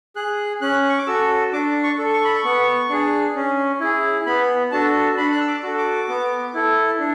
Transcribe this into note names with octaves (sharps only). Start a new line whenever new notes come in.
G#4 F#6
C#4 F#6
C#6
D6
F#4 A4 E6
D4 D6
C#6
A4
C#6
B5
C#6
B3
D4 G#4
C#4
E4 G#4
B3 B5
D4 F#4 A4 A5
D4 B5
F#6
E6
D6
F#4 A4
D6
B3
E4 A4
D4